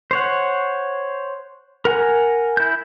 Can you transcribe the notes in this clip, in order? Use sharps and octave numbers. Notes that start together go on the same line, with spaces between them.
C5 C#5 F#5
A#4 F#5 G#5
E4 G6